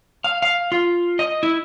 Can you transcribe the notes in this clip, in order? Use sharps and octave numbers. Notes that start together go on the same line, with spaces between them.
F5
F5
F4
D#5
E4